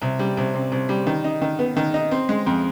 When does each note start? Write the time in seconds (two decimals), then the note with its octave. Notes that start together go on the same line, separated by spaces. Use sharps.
0.02 C2
0.19 G3
0.37 C2
0.54 C3
0.72 C2
0.89 G3
1.07 D#3
1.24 D#4
1.42 D#3
1.59 B3
1.76 D#3
1.94 D#4
2.11 C4
2.29 G#3
2.47 F2